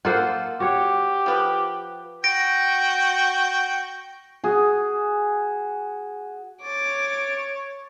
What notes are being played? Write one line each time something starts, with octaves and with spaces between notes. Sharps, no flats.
A#3 F4 A4 C5 F#5
F#4 G4 C#5
F3 B4
F#4 G5 A#6 D7
F#4 G#4
C#5 D6 A6